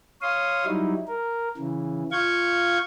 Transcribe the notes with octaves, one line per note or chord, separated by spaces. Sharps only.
C#5 F5 C6 D#6
F#3 G3 D#4 E4
A#4
C#3 E3
F4 F5 C#6 G6 G#6